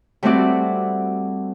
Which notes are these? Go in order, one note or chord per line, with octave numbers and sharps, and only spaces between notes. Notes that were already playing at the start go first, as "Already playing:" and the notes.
G3 A3 C4 E4 F#4 D5